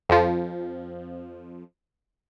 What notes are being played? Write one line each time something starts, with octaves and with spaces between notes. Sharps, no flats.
F2 F3